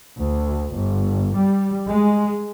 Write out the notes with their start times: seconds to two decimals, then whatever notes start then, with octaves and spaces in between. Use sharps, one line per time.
0.18 D2
0.74 G1
1.37 G3
1.87 G#3